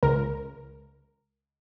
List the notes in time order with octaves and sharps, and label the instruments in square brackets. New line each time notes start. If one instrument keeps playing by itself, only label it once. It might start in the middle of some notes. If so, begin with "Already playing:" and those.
[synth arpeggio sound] C#2 A#4